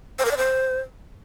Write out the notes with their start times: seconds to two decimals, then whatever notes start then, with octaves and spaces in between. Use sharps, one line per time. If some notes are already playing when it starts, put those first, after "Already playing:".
0.19 C5
0.25 A#4
0.31 D5
0.37 C5